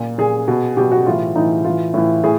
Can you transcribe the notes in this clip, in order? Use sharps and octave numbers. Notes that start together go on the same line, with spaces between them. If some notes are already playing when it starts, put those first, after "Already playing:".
Already playing: A#2
A#2 G#4
B2
B2 G4
F#4
A2 E3 F4
A2 E3 D#4
A2 E3 F4
A2 E3
A2 G#4